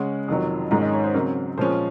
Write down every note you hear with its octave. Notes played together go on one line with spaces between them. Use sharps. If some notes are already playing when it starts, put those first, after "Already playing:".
Already playing: C#3 G#3 C#4 F#5
F2 C3 D#3 F#3
G#2 D#3 G#3 C#4 A#5
D#5
C#5
C5
C#3 F#3 C4 A#4
A#2 F3 G#3 C#4 C5